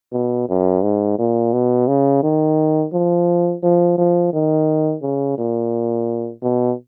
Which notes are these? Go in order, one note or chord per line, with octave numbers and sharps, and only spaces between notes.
B2
F#2
G#2
A#2
B2
C#3
D#3
F3
F3
F3
D#3
C#3
A#2
B2